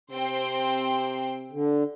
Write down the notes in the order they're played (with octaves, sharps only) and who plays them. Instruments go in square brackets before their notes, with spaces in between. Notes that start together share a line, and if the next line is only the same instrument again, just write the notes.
[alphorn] C3 [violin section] C4 C5 G5
[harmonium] D3